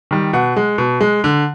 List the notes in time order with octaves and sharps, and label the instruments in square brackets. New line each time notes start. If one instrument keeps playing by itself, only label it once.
[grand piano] D#3 G3
B2 F#5
G#3
B2
G#3
D3